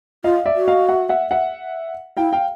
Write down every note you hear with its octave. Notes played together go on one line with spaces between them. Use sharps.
F4 D#5 F5
D5 E5
F#4
D#5 F5
E5 F#5
E5 F#5
E5 F#5
E4 F5 G5
F5 G5